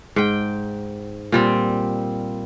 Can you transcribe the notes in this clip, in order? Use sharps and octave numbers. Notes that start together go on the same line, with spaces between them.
G#2 G5
A#2 G3 C4